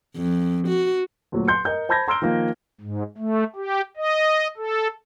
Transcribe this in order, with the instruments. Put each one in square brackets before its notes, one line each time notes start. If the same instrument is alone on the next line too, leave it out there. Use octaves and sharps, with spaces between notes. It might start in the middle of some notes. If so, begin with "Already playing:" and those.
[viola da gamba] F2
F#4
[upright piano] D2 A#2 F#3
C6 G6 C#7
A#4 D#5 G6
C5 A5 B5 G6 G#6 A#6
A#5 C6 E6 F6 D7 G7
D#3 F3 A#3
[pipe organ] G#2
A3
G4
D#5
A4